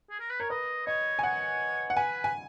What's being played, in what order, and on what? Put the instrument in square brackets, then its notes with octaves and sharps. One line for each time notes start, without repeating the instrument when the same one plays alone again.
[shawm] G#4
A#4
B4
[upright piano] A#4 [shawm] C#5
[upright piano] B4 [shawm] D#5
[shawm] C#5 [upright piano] D#5
[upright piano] G#5
[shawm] C#5 [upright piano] F#5
[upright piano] F#5
[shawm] B4 [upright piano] G#5
[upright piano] G#5